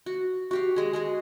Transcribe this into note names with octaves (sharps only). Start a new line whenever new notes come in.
F#4
F#4 G4 F5
G#3 G#4
G#3 F#4 G#4